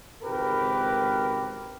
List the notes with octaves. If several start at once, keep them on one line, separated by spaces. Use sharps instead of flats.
G#1 C#2 C4 G4 A#4 B4